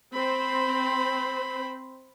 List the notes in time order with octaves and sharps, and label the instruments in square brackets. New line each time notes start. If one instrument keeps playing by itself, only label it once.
[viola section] C4 C5 [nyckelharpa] B5